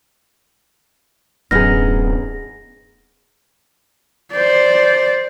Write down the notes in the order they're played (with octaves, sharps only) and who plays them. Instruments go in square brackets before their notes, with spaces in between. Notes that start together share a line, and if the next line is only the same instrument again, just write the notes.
[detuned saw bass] D1 [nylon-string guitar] F#2 B3 D#4 [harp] G#4 F6 [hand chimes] A#6
[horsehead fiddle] C5 D5